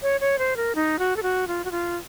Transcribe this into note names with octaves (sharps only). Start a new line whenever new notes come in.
C#5
C#5
C5
A#4
D#4
F#4
A4
F#4
F4
F#4
F4